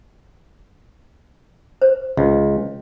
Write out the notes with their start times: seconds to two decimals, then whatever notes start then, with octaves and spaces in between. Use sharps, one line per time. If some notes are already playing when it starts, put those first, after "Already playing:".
1.82 C5
2.17 C#2